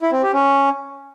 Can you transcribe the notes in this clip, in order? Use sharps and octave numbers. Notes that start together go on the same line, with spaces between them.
E4
C4
G4
C#4